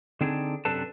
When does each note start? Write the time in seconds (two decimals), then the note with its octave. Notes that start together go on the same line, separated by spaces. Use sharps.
0.21 D3 C4 D4 D#4 G#4
0.65 F#2 C3 D4 A4 B4 A5